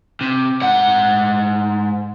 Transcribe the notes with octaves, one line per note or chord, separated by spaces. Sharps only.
C3
G#2 F#5